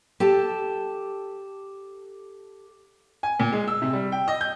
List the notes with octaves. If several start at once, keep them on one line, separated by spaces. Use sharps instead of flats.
G4 A4 A5
G#5
A#2
G#3
E6
C3
G3
G5
D#5
G6